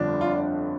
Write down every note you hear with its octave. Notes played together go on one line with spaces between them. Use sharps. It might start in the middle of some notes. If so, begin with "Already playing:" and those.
Already playing: G1 F2 D3 F3 D4
F4